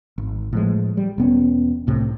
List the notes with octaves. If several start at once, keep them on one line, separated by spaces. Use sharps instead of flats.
G#1
A2 F3 G#3
G3
E1 B3 C#4
C2 A2 C3